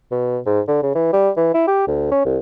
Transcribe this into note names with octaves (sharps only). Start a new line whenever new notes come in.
B2
G#2
D3
C#3
E3
G3
E3
E4
G4
D2
C#4
C2